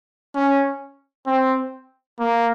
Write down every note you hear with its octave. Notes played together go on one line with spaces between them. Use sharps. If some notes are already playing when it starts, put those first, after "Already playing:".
C#4
C4
A#3